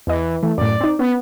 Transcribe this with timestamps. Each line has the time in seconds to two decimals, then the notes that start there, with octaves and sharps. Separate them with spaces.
0.07 E2 E3 D#5
0.43 E3 A3
0.58 F#2 A2 D5
0.81 C4 D#4
0.99 B3 C#4